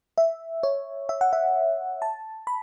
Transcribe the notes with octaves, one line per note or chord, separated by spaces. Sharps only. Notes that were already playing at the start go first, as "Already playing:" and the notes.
E5
C#5
E5
F#5
E5
A5
B5